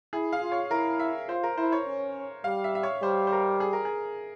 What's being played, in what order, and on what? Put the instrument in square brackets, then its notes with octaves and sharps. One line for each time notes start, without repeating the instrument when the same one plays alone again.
[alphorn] E4 [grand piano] G#4
[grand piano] F5
[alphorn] F4
[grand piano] C#5
[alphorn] E4 [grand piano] A#4
[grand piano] E5
[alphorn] F4 [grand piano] C5
[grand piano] A#4
[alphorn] E4 [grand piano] C5
[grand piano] C#5
[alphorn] C#4
[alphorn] G3 [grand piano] F5
[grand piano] E5
E5
C#5
[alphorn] G3 [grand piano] C5
[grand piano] C5
A#4
G#4
A#4
G#4